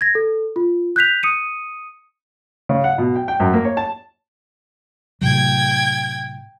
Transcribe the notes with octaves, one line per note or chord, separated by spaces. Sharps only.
G#6 A#6
A4
F4
F#6 G6 B6 F7
D#6 C#7 D#7
C#3
F#5
B2
G5
G5
F#2
A#3
C#5
A5
A2 C3 F#3 G5 G#6